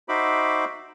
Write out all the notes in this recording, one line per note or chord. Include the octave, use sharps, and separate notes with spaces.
D#4 F#4 C5 E5 B5 D6